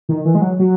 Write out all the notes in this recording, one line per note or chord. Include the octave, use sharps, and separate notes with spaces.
D#3
E3
G#3
F#3
F#3